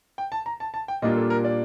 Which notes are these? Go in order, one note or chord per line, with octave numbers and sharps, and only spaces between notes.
G5
A5
A#5
A5
A5
G5
A#2 G3 A#3 D4 F4 D#5
A4
A#4
D5